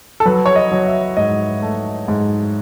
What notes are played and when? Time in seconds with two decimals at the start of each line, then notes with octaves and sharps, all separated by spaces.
0.20 A4
0.26 F#3 B4
0.46 C#5
0.56 D#5
0.72 F#3
0.87 E5
1.17 G#2 D#5
1.62 A3
2.08 G#2